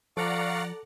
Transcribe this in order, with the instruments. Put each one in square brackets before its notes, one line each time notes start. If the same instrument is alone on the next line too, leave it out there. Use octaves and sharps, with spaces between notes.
[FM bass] F3 [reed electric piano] A4 D6 [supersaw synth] D5 F#5 A#5 [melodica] F5 C#6